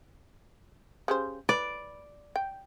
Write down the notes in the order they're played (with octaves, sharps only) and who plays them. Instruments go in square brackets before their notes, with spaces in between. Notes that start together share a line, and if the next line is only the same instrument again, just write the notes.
[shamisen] C#3 G4 C5
[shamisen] B4 [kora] D5
[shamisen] G5